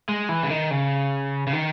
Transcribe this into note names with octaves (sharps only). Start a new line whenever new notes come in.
G#3
E3
C#3
D#3
C#3
C#3
D#3